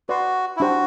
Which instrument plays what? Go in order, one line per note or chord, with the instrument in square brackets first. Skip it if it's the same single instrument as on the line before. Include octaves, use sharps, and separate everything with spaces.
[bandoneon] F#4 [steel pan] B4 D5 F#5 C6
[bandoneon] E4
[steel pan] D4 G4 C5 G5 [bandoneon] F#4